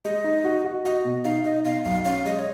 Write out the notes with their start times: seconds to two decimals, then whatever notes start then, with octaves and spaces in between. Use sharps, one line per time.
0.05 G#3 D#5
0.24 D#4
0.44 F#4
0.65 F#4
0.85 F#4 D#5
1.04 B2
1.24 D#4 F5
1.44 D#4 D#5
1.64 B2 F5
1.84 B1 F5
2.05 C#4 F5
2.25 G#3 D#5
2.39 C#5